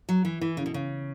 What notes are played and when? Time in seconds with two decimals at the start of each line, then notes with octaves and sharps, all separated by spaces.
0.09 F#3
0.25 E3
0.41 E3
0.57 C#3
0.66 B2
0.74 C#3